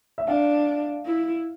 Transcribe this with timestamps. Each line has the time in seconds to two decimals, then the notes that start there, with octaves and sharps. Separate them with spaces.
0.18 E5
0.27 D4 F5
1.05 E4